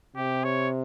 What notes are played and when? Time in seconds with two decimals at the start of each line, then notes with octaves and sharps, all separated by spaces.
0.16 C3 G4
0.44 C#5